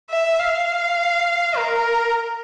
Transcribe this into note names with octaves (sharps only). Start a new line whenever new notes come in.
E5
F5
A#4